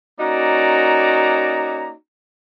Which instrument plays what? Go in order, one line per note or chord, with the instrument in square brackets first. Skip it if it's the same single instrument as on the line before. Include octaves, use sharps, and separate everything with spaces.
[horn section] A#3 C#4 D#4 F#4 D5 A#5